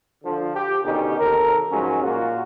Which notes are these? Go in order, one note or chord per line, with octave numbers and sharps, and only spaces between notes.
D3 F3
G4
B2 D3 D#3 C#4 D#4 G4
D#2 C3 A4 A#4
G#2 F3 F#3 G#3 C#4
A#2 G#3 A#3 F4 F#4